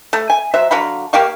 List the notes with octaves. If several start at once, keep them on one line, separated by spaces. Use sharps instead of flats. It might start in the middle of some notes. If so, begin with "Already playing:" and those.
A3
G#5
F#3 C5 E5
D3 F#3 F5 B5
A#3 G4 F5 C#6